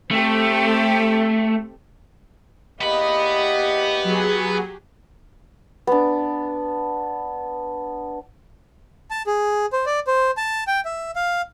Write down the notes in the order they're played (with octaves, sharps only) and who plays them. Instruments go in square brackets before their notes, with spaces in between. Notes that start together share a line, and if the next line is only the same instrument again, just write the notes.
[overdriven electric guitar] A3 [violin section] C4 G4 A4
[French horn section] E2 A#3 D#5 [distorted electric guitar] B3 B5 [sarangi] G4
[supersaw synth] F#3 G#4
[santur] B3 D4
[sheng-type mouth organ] A5
G#4
C5
D5
C5
A5
G5
E5
F5